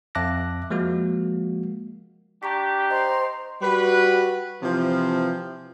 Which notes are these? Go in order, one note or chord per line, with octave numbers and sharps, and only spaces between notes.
F2 E5 A5 D6 F#6 A#6
F3 G#3 A#3 F#4
D4 G4 A#5 C#6 B6
C5 D#5 A#5 C6
G3 F#4 B4
C3 E3 F3